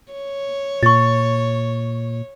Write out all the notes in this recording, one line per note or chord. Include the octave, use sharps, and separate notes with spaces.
C#5
A#2 C#6 A6